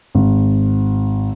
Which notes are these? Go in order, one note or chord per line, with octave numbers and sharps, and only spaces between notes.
G#1